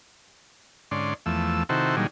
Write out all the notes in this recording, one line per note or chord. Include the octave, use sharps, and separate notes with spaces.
G#2 D3 C#4 D5 C6
E2 F3 A3 E6
C3 D#3 E4 F#4 A4 C5
A#2 D3 D#3 F#3 G3 G#4